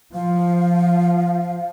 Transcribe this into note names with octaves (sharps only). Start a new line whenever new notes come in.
F3 F5